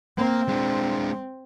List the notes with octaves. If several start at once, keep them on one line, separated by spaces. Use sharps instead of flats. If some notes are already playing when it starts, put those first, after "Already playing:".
A#3 C4
G#3 D4